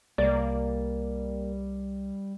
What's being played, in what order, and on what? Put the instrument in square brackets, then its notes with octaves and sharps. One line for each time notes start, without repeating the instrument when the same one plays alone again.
[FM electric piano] C2 [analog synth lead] G3 [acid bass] A#3 [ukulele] D5